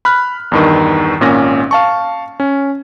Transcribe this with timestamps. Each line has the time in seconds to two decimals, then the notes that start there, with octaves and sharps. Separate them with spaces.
0.05 B5 F6 F#6
0.52 E2 G2 D#3
1.20 G#1 A#2 C#4 A#6
1.71 F5 A5 C#6
2.40 C#4